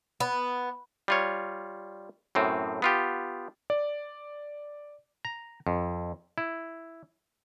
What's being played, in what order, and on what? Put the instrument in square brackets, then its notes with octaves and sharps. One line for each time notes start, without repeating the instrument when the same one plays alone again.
[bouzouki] B3
[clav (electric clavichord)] G3 F4 C#5
F#2 A2 C4
B3 F4 G4
[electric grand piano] D5
[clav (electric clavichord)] A#5
F2
E4